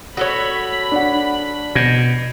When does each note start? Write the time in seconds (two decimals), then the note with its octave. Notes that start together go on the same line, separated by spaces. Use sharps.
0.17 F#4 A4 C#5 B5
0.92 D4 F#5
1.75 B2 G6 G#6 A#6